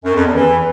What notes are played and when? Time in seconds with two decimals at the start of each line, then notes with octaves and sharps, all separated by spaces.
0.04 F#2
0.14 F2
0.24 E2
0.34 E3